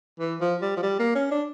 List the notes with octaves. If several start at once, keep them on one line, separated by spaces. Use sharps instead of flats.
E3
F3
G3
F3
G3
A#3
C#4
D4